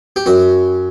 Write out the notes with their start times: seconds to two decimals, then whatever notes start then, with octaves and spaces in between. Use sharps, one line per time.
0.16 G4
0.26 F#2 F#4